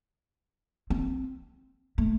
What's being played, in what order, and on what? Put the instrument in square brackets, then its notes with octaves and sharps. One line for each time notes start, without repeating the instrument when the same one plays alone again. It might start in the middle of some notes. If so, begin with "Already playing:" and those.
[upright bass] C4
A3